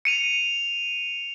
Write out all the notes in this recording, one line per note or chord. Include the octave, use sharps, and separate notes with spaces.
C#7 D#7 F7